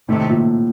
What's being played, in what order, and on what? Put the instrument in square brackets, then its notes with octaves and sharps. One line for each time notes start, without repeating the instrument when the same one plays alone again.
[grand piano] A2 [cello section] C3 D#3 A3
[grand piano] A#2